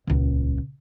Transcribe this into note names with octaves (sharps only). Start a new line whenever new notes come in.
D#1 C#2